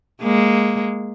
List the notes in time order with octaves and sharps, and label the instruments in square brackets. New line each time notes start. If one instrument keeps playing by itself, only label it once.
[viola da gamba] G#3 A#3